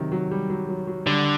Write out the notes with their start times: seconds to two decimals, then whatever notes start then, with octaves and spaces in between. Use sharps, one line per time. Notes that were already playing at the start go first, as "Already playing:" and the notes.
Already playing: C3 D#3 F#3
0.12 F#3
0.31 G3
0.50 F#3
0.69 F#3
0.87 F#3
1.07 D3 G3